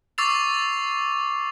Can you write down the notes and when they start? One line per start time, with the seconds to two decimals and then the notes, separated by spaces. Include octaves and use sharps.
0.18 C#6 D6 E6 A6 C7 F7